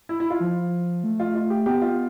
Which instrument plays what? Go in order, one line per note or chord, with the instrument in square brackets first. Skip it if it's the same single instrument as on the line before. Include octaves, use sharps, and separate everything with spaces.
[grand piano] E4
E4
F4
[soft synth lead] F3
A3
[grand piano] F4
F4
G4
[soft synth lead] B3 [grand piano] G4
[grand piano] F4